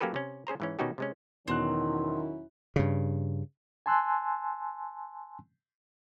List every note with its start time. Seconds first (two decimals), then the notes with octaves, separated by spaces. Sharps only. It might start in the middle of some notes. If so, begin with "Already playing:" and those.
0.01 F#3 A#3 C#4 G4 A4 B4
0.14 C3 C#4
0.47 C#4 G#4 C5 A#5
0.60 G#2 E3 C#4
0.79 B2 D#3 C#4 D#4 F#4 G4
0.98 C3 G#3 C#4
1.48 E2 B2 D#3 F#3 C4 C#4 E4 F#6
2.76 G2 C#3
3.86 G#5 A5 C6 E6 F#6